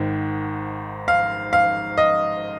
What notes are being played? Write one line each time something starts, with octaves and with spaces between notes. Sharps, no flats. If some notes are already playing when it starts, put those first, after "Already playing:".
Already playing: G#1 G#2 D#3
F5
F5
D#5